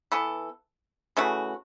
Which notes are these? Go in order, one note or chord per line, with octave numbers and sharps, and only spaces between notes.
E3 B3 A4
C#3 E3 A3 F#4